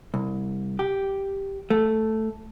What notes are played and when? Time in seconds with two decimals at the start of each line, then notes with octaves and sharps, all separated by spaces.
0.14 C2
0.79 G4
1.70 A3